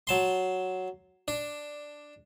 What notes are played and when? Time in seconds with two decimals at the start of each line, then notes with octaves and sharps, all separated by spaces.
0.07 F#3 A5 C6
1.28 D4